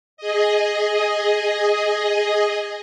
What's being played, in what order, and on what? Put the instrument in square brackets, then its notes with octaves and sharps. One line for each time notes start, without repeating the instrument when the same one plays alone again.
[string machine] G#4 D#5